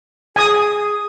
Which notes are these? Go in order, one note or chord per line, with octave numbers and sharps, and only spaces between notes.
G#4 G#5 D#6